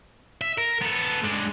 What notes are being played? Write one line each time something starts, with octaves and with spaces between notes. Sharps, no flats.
E5
A#4
B3 A4
G#3 D4